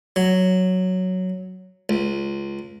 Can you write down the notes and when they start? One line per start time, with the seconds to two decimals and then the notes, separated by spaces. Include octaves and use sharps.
0.16 F#3
1.89 C#2